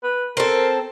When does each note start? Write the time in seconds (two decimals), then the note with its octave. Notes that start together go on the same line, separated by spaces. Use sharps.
0.04 B4
0.37 C4 A4 A#4